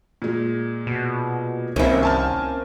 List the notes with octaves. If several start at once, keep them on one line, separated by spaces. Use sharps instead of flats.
A#2 G#3
B2
C2 D#3 A#3 C4 C#4 E4
G#5 A5 F6